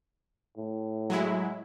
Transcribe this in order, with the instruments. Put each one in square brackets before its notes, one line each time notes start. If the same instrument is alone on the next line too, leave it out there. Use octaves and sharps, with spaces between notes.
[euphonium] A2
[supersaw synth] F#3 G#3 E4